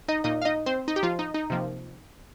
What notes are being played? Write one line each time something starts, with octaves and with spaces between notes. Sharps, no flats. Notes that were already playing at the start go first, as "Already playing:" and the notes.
D#4 D#5
A#2 A#3 D#4 D#5
F5
D#4 D#5
C4 C5
D#4
G4
F3 F4
D#4
D#4
C3 F3 A#3